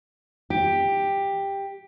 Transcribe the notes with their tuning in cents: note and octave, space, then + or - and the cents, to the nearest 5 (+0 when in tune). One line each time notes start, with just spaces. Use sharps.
G4 +10